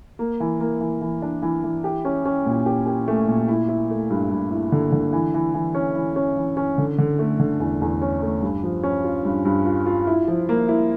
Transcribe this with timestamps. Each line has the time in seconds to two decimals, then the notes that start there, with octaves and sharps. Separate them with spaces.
0.19 A#3
0.40 E3
0.60 A#3
0.81 E3
1.01 E3
1.22 D4
1.42 E3
1.64 E3
1.84 G4
2.05 C#4
2.25 C#4
2.46 A#2
2.66 G4
2.86 G4
3.08 A3
3.28 A#2
3.48 E4
3.69 E4
3.90 A3
4.10 G2
4.31 G2
4.51 E4
4.72 D3
4.92 D3
5.13 E3
5.34 E3
5.54 E3
5.75 C#4
5.95 E3
6.16 C#4
6.37 E3
6.57 C#4
6.78 D3
6.98 D3
7.19 A3
7.39 D3
7.60 E2
7.81 E2
8.01 C#4
8.22 A3
8.42 G2
8.63 F3
8.83 C#4
9.04 F4
9.25 G2
9.45 G2
9.66 F4
9.86 F4
10.07 E4
10.28 F3
10.49 A#3
10.69 E4